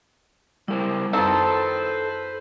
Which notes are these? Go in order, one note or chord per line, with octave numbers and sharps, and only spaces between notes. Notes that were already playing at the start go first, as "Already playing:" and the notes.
G3 E4 A#4 C5
F#2 D#3 C4 A4 B4 C5 A5 C6